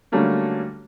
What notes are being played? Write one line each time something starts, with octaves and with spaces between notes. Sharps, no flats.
D3 F#3 G3 A3 A#3 C#4